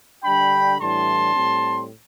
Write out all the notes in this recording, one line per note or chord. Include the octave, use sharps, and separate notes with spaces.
D3 G3 D4 G5 B5
A2 E3 G3 D4 A5 C6
A2 G3 C4